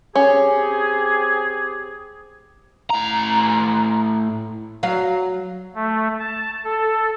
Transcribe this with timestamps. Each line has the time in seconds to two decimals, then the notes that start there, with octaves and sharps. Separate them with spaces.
0.15 C4 C#4 G4 G#4
2.90 A2 A#5
4.83 F#3 F5
5.75 A3
6.20 A5
6.64 A4